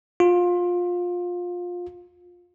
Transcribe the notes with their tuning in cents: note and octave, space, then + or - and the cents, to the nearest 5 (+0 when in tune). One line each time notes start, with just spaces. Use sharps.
F4 +20